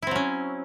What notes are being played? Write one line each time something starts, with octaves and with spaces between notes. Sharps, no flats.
F#3 C4 C#4 E4